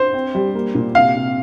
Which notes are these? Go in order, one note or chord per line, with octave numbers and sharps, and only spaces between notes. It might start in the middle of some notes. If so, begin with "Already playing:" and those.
Already playing: C5
C4
G3
A#3
A#2
C3 F5
C3